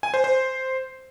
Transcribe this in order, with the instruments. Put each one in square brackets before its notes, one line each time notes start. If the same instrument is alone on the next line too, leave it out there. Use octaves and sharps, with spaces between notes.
[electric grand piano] G#5
C5
C5